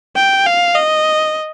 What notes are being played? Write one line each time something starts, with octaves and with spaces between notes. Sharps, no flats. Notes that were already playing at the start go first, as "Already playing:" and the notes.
G5
F5
D#5